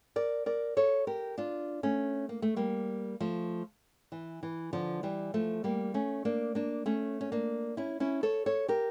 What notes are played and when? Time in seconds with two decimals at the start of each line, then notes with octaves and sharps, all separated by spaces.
0.16 A#4 D5
0.46 A#4 D5
0.77 A4 C#5
1.07 G4 A#4
1.38 D4 F4
1.83 A3 C#4
2.29 A#3
2.42 A3
2.56 G3 A#3
3.20 F3 A3
4.12 E3
4.43 E3
4.73 D3 F3
5.03 E3 G3
5.34 F3 A3
5.64 G3 A#3
5.94 A3 C#4
6.25 A#3 D4
6.55 A#3 D4
6.86 A3 C#4
7.21 C#4
7.32 A#3 D4
7.77 C#4 E4
8.00 C#4 E4
8.23 A4 C#5
8.46 A4 C#5
8.68 G4 A#4